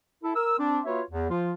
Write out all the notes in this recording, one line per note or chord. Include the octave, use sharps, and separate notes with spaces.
E4 A4
A#4 E6
C4 D4
A#3 F4 F#4 B4 C#5 E5
E2
F3 F4